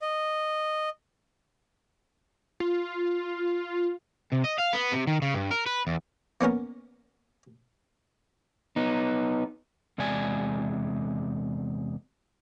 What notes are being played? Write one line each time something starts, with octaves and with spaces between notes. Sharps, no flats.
D#5
F4
C3
D#5
F5
B3
C3
D#3
C#3
G2
A#4
B4
E2
A#3 B3 C#4 A#4
B3 D#4
E2 C3 G#3 D5 G#5